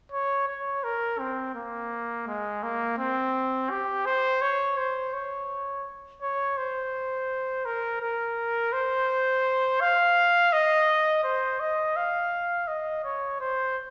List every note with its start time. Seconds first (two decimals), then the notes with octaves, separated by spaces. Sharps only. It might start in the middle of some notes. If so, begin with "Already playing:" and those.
0.12 C#5
0.48 C#5
0.84 A#4
1.19 C4
1.55 A#3
2.27 G#3
2.63 A#3
2.98 C4
3.71 G4
4.06 C5
4.42 C#5
4.78 C5
5.13 C#5
6.22 C#5
6.57 C5
7.66 A#4
8.01 A#4
8.73 C5
9.81 F5
10.53 D#5
11.24 C5
11.60 D#5
11.96 F5
12.68 D#5
13.04 C#5
13.40 C5